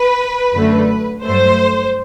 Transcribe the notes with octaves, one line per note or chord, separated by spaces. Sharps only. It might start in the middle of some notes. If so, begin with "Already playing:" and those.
Already playing: B4
F#2 D3 A3
G2 F#3 A3 C5